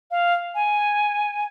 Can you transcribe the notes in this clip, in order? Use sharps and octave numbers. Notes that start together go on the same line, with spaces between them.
F5
G#5